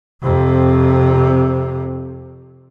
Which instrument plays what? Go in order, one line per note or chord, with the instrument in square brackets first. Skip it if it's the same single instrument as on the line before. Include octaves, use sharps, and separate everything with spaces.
[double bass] F2 C3